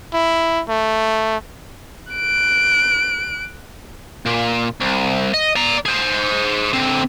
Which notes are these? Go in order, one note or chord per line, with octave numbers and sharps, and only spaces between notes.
E4
A3
F#6 D7
A#2
C2
D#5
D5 A#5
G#4 C5
D3 C4